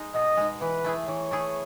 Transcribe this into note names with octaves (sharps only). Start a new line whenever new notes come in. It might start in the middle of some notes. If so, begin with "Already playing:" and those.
Already playing: G#3 D#4
B2 D#5
G#3 D#4
E3 B4
A3 E4 G#4
E3 C#5
A3 E4 G#4